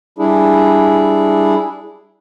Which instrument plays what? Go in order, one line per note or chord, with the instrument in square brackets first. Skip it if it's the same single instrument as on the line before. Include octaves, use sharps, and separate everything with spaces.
[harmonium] G3 D4 E4 G#4